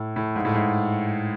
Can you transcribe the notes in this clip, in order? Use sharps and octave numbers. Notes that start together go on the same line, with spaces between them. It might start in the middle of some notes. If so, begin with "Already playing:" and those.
Already playing: A2
A2
G#2
A2
G#2